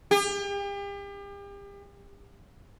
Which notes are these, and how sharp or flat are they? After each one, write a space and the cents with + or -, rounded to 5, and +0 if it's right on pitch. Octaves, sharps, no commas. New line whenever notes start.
G4 +40